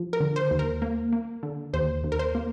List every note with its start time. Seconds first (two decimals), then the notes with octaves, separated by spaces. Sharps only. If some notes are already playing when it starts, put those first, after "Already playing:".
Already playing: F3
0.13 A#4
0.20 D3
0.36 C5
0.51 D#2
0.59 A#4
0.82 A#3
1.13 A#3
1.43 D3
1.74 D#2 C5
2.04 D#2
2.12 A#4
2.19 C5
2.35 A#3